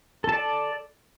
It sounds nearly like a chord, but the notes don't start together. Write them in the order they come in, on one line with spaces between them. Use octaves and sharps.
A4 A5 D5